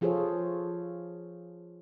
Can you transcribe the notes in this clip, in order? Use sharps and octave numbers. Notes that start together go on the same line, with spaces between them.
F3 F4 G#4 A4 C5 C#5